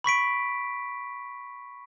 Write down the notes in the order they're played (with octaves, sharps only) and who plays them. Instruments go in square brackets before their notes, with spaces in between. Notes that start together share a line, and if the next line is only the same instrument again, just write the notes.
[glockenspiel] B5 C#6 B6 D7